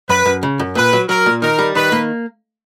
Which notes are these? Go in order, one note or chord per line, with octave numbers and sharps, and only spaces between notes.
F#2 B4
F#2
C#3
F#2
A#2 B4
F#3
F#3 A#4
A#2
D#3 A#4
G3
D#3 B4
A#3